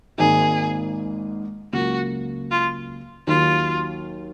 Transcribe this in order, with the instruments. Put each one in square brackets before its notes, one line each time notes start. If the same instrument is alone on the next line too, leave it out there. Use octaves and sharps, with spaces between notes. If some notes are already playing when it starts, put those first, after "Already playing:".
[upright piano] G#1 G#2 D#3 A#3 D#4 [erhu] G#4
[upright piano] C#2 C#3 F#3 A#3 [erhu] F#4
[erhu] F4
[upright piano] D#2 D#3 F#3 [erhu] F4